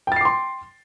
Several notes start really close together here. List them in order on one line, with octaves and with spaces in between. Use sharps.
G5 A6 C7 D6 C6